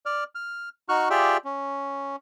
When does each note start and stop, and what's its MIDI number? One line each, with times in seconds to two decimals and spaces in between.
0.06 0.24 74
0.06 0.24 89
0.35 0.69 89
0.89 1.09 63
0.89 1.09 66
0.89 1.09 85
0.89 1.09 89
0.89 1.09 90
1.10 1.37 65
1.10 1.37 67
1.10 1.37 68
1.10 1.37 74
1.10 1.37 76
1.10 1.37 79
1.45 2.16 61